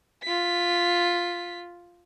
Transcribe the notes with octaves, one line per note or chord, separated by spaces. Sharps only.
F4 B6